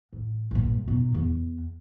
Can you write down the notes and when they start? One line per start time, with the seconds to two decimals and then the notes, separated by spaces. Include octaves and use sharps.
0.13 A1
0.51 A#1 G2
0.88 B2 D#4
1.14 E2